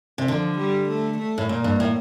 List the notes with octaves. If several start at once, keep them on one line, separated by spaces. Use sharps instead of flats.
C3
D3 F3
G3
A3
A3
A2
A#2 A#3
G2
A2